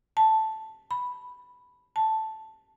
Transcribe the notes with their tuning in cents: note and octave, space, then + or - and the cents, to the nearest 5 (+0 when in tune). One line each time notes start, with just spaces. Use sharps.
A5 +0
B5 +0
A5 +0